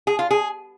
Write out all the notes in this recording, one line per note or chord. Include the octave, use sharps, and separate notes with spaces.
G#4
F4
G#4